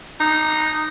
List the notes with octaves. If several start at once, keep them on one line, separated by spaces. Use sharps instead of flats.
D#4